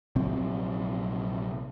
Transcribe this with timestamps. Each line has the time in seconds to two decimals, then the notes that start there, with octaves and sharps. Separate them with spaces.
0.16 A#1 C3 F#3 C4